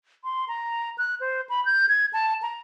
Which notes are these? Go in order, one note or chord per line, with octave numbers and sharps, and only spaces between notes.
C6
A#5
F#6
C5
B5
G6
G#6
A5
A#5